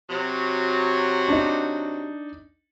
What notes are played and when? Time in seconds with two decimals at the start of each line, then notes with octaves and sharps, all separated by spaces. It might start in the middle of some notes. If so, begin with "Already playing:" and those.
0.10 C3 F#3
1.29 D4 D#4